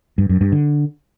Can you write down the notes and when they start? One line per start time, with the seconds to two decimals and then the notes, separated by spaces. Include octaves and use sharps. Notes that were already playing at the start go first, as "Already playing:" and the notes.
0.18 G2
0.29 F#2
0.41 G2
0.52 D3